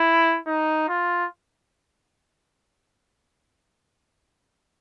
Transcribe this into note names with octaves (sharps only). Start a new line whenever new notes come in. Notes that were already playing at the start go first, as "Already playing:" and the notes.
Already playing: E4
D#4
F4